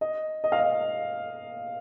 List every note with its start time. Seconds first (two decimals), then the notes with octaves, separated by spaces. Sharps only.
0.01 D#5
0.44 D#5
0.52 F5
0.59 D#5